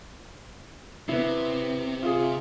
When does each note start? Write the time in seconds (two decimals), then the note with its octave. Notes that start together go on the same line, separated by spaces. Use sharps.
1.09 C3 B3 E4
2.03 F4 G#4